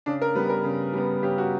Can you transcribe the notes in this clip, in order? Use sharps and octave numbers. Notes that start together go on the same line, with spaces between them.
C#3 D4
A#4
G3 B3 B4
A#4
C#3
G3 B3
C#3 G4
F#4